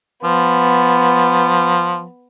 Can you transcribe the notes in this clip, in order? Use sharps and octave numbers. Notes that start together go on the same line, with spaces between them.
F3 B3